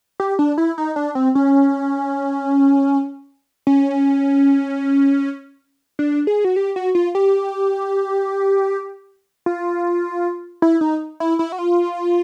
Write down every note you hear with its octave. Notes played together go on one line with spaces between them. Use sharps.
G4
D4
E4
D#4
D4
C4
C#4
C#4
D4
G#4
F#4
G4
F#4
F4
G4
F4
E4
D#4
E4
E4
F#4
F4